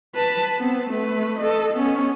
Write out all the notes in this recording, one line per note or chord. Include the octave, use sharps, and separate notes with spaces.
B4 A5
B3 C4
A3 B4
A4 D#5
B3 C#4